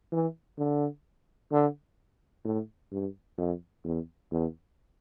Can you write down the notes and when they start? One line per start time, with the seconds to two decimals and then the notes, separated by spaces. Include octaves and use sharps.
0.12 E3
0.58 D3
1.52 D3
2.45 A2
2.92 G2
3.38 F2
3.84 E2
4.31 E2